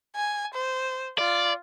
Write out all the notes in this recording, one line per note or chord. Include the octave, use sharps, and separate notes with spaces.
G#5
C5
F4 D5